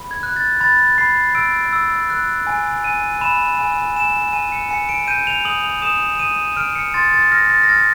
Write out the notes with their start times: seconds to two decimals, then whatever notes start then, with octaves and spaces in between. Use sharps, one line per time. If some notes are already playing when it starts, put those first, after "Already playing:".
Already playing: B5
0.11 G#6
0.23 F#6
0.36 A6
0.61 B5 A6
0.98 B5 C7
1.35 E6 D7
1.73 E6
2.10 F#6
2.47 G#5
2.84 G#5 D#7
3.21 B5 E7
3.59 G#5
3.96 G#5 E7
4.33 G#5 D#7
4.52 C#7
4.70 G#5 C#7
4.89 D7
5.07 G6 D#7
5.27 F7
5.45 D#6 F#7
5.64 F7
5.82 D#6 E7
6.19 D#6 D#7
6.57 F6 D7
6.75 C#7
6.94 C6 A6
7.13 A6
7.31 F6 A#6
7.50 A6
7.64 A#6
7.69 F6 A6